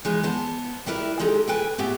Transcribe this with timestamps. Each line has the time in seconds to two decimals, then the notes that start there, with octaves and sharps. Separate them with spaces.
0.05 E3 G#3 D#4
0.23 B3 C5 A5
0.86 G3 E4 A#4 B4 E5
1.19 G#3 D#4 G4 A4
1.48 A4 B4 G5 G#5
1.78 A2 B3 G4 E5